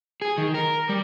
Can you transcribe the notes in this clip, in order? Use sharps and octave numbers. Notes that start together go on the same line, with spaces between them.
G#4
D#3
A#4
G3